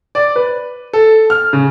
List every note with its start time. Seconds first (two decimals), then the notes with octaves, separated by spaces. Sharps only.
0.15 D5
0.36 B4
0.93 A4
1.30 F6
1.53 C#3